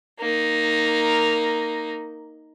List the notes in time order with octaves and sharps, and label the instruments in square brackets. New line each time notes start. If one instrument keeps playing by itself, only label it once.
[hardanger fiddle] A#3 D#4